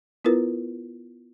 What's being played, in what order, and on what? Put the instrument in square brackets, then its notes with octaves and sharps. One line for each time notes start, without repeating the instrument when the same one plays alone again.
[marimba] B3 E4 F4 A#4 B4